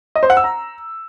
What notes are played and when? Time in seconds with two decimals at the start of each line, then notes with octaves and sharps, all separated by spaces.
0.15 D#5
0.23 C5
0.30 F#5
0.37 E6
0.44 A#5